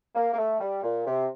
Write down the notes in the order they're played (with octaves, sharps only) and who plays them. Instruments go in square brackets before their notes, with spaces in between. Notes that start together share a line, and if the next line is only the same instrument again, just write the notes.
[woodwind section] A#3
A#3
A3
G3
A#2
C3